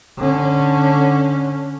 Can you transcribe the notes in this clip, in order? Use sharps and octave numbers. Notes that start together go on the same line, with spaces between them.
D3 C#4